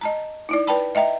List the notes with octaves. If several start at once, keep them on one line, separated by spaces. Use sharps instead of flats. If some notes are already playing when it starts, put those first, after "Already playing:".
D#5 A5 A#5
D#4 E4 D5
B4 D5 G5 A5 B5
D#5 E5 G5 A#5